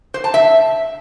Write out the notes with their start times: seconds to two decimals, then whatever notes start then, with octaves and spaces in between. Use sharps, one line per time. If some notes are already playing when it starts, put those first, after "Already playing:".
0.14 C5
0.24 A5
0.34 E5